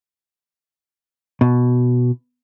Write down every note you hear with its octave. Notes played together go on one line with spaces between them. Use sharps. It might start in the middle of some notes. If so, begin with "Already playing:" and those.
B2